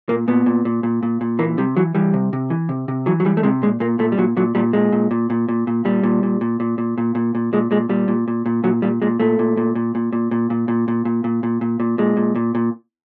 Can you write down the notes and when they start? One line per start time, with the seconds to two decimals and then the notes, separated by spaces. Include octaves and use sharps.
0.09 A#2 A#3
0.28 A#2 B3
0.46 A#2
0.65 A#2
0.83 A#2
1.03 A#2
1.21 A#2
1.39 E3 A#3
1.58 C3 G3
1.77 E3 F#3
1.95 E3 G3
2.14 C3
2.33 C3
2.50 E3
2.69 C3
2.88 C3
3.06 E3 F#3
3.20 F#3
3.25 E3 G3
3.37 A3
3.43 C3 G#3
3.62 A#2 G#3
3.80 A#2 A#3
3.99 A#2 A3
4.12 G3
4.18 A#2 F#3
4.37 A#2 F#3
4.55 A#2 G3
4.73 A#2 G#3
4.92 A#2
5.11 A#2
5.30 A#2
5.48 A#2
5.67 A#2
5.85 A#2 G3
6.03 A#2
6.23 A#2
6.41 A#2
6.60 A#2
6.78 A#2
6.98 A#2
7.15 A#2
7.35 A#2
7.53 A#2 G#3
7.71 A#2 G#3
7.89 A#2 G3
8.08 A#2
8.28 A#2
8.46 A#2
8.64 A#2 F#3
8.82 A#2 G3
9.02 A#2 G#3
9.20 A#2 A3
9.39 A#2
9.57 A#2
9.75 A#2
9.95 A#2
10.13 A#2
10.31 A#2
10.50 A#2
10.68 A#2
10.88 A#2
11.05 A#2
11.24 A#2
11.43 A#2
11.61 A#2
11.80 A#2
11.98 A#2 G#3
12.17 A#2
12.36 A#2
12.55 A#2